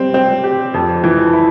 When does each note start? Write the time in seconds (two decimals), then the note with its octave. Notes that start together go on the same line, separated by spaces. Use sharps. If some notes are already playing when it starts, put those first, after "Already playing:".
Already playing: G3 C4
0.14 C4
0.44 G4
0.74 F2
1.04 E3
1.33 E4